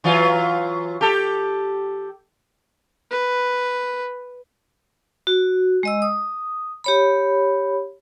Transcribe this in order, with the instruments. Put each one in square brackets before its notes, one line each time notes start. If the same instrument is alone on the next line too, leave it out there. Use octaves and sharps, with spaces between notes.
[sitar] E3 F#3 F4
G4 A4
[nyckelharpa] B4
[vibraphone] F#4
G#3 D#5 E6
D#6
G4 C#5 B5